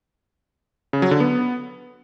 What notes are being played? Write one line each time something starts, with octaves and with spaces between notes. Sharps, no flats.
C#3
F#3
D3
B3